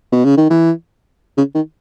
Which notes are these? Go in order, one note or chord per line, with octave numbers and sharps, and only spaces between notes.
B2
C#3
D#3
E3
C#3
D#3